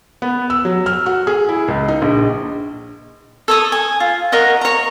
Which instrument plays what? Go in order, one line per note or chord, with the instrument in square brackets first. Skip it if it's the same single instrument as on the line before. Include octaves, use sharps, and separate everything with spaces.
[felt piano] B3
E6
F#3
F6
F#4
G#4
E4
C#2
D#4
A#1
[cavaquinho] A4 C#5 D#6
G#5
F4
A#4 C#5 D#5 F#5
C#5 A#5